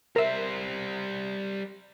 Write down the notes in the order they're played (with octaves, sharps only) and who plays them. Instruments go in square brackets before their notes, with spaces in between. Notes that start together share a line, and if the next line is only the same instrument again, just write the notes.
[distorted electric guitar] G3 C5 [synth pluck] A#4 E5